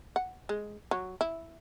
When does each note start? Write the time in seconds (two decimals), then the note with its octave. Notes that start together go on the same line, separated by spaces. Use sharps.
0.16 F#5
0.49 G#3
0.91 F#3
1.21 E4